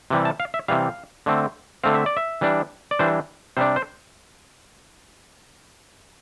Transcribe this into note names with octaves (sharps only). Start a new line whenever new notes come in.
C3 E3 G3
A5
F5
E5
C3 E3 G3 F5
D3 A3 C4
D3 A3 C4 F5
E5
D5
E5
E3 G3 D4
D5
E3 G3 D4 C5
C3 G3 D4 C5
C5